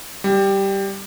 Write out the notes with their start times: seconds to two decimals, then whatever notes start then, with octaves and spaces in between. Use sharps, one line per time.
0.24 G3